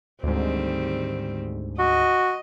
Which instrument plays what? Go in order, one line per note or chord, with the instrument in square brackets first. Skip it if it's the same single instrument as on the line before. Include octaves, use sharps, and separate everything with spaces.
[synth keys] D2 G#2 [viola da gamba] D#3 G3 C4
[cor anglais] F#4 [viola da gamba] D#5